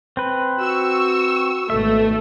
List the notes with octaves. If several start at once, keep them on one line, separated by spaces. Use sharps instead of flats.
C4 B4
F#4 C#6 E6
G#1 B2 A3 E5